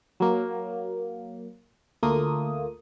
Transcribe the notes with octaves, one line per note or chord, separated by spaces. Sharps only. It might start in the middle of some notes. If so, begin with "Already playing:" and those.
F#3 A#3
D2 A3 A#3 F4 D#6